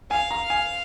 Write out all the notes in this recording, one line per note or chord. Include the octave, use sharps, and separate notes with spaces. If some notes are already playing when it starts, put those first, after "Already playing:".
F5 G#5
A#5
G#5